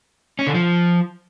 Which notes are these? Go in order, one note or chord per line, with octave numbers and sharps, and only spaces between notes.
C#4
D3
F3